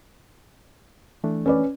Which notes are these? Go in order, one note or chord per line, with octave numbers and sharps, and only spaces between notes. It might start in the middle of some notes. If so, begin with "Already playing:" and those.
E3 A3 D4
C#4 B4 D5